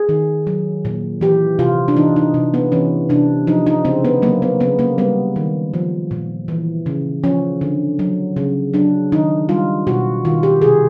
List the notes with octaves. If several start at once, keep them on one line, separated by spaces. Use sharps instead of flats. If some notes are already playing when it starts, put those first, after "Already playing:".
Already playing: G#4
D#3
F#3
A#2
E3 G4
C3 F4
D4
E3 D#4
D#4
C3
B3
E3 C#4
C3 D4
F3 D#4
D#4
C#3 C4
B3
F#3 A#3
B3
C#3 B3
A#3
G3 B3
D#3
F3
A#2
E3
C#3
F3 C#4
D3
F#3
C#3
F#3 D4
D#3 D#4
G3 F4
B2 F#4
D#3 F4
G4
C3 G#4